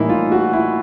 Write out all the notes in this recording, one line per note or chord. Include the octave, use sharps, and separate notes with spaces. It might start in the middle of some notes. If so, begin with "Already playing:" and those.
Already playing: A2 E3 G3 A#3 D#4 E4
F4
F#4
E4